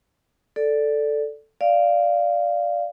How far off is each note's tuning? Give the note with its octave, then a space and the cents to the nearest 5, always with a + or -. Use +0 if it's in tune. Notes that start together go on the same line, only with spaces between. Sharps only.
A4 +0 D5 +0
D5 +0 F5 -10